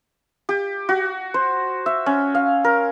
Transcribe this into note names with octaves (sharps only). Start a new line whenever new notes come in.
G4
F#4
C5
E5
C#4
F5
A#4